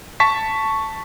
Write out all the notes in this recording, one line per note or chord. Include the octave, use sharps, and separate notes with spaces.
A5 C#6 B6